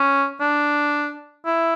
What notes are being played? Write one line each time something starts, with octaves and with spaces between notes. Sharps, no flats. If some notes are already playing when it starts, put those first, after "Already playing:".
Already playing: C#4
D4
E4